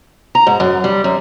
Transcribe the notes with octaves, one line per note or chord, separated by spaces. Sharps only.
A#5
G#2
F#2
G3
F#2